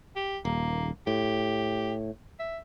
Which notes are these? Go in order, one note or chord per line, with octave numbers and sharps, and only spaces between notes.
G4
D#1 A#3
A2 G4
E5